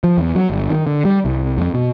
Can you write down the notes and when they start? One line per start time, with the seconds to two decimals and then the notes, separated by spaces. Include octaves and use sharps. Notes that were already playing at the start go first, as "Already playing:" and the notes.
0.04 F3
0.18 E2
0.35 F#3
0.50 G1
0.70 D#3
0.87 D3
1.05 G3
1.25 C2
1.58 F2
1.74 B2